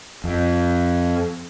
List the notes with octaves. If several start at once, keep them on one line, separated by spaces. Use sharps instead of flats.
F2